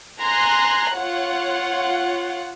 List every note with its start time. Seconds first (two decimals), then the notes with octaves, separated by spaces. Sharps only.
0.21 G#5 A#5 C6 F#6
0.96 F4 C#5 F#5